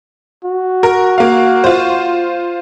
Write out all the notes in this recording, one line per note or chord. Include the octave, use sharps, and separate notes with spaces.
F#4
A#4
A#3 F5
F4 C5